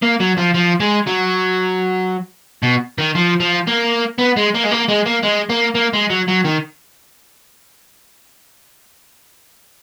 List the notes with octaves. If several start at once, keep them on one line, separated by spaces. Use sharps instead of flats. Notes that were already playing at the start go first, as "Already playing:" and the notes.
A#3
F#3
F3
F3
G#3
F#3
B2
D#3
F3
F3
A#3
B3
G#3
A#3
G#3
A#3
G#3
A#3
G#3
A#3
A#3
G#3
F#3
F#3
D#3